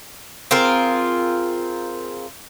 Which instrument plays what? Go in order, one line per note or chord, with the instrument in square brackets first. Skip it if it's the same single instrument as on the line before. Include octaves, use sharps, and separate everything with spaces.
[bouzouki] C4 F4 G#4 A#4